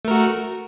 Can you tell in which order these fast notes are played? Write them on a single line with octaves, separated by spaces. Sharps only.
A3 A#4 F#4